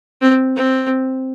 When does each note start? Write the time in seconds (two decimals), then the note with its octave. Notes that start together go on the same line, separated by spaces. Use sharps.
0.22 C4
0.56 C4